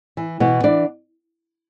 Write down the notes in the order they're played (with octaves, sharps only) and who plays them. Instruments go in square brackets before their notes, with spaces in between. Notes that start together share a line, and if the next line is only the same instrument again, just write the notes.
[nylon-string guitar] E3
B2 E3 B3
E3 D4 D5